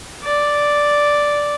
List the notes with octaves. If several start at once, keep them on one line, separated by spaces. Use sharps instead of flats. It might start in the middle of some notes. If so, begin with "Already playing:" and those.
D5